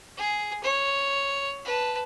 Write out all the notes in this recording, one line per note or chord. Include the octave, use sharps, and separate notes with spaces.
G#4
C#5
B4 A5